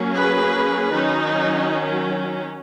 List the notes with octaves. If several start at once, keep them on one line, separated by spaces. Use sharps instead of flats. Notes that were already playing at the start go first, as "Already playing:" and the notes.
Already playing: F#3 A#3 C#4
G#4 B4
D#3 F#3 C#4 D#4